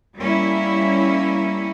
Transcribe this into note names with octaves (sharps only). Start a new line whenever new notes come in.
G3 A#3 C#4 E4